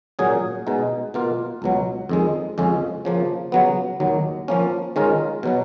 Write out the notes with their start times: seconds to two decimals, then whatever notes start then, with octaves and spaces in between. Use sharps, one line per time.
0.19 A#2 F#3 C#4 G#4
0.67 B2 G#3 D#4
1.14 B2 A#3 F4
1.62 C#2 B2 F#3
2.09 F2 D#3 G#3
2.58 F2 C#3 G#3 C#4
3.05 C#3 F3 A#3
3.52 C#3 F#3 B3
4.00 D#2 D#3 F#3
4.48 F3 A#3 C#4
4.96 D#3 G#3 C#4 F4 A#4
5.43 B2 F#3 B3